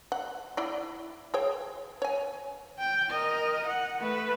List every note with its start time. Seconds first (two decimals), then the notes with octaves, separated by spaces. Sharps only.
0.12 F#5
0.57 E4 D5
1.34 G#4 C#5 G5
2.02 C#5 G#5
2.79 G5
3.11 A#4 D#5
3.67 F#5
4.00 A3 B4